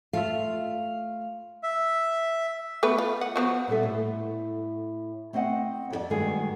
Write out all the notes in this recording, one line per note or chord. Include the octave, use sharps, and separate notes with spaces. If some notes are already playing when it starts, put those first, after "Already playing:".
A3 F4 E5 F5
E5
A3 B3 B4
F4
F#5
F3 B3 F#4
A#2 G3 A4 E5
A2
A3 C4 C5 D#5 F#5
F2 G4 D5
G2 D#3 G#3 A3 F#4 G#4